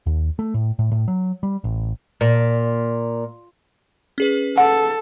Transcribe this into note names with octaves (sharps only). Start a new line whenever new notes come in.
D#2
A3
A2
A2
A2
F#3
G3
A1
A#2
C#4 G#4 B4
A4 F#5